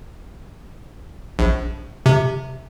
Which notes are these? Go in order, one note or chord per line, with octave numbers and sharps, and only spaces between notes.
A#1
C3